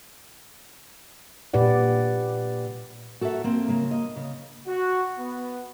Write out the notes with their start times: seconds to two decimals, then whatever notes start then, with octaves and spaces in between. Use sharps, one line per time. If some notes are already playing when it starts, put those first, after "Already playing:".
1.54 A#2 G4 B4 D5 F#5
3.21 F#4 A4 A#4 C#5 E5
3.44 A#3 C4
3.68 C#3 A#3
3.91 D#5
4.16 C#3
4.67 F#4
5.18 B3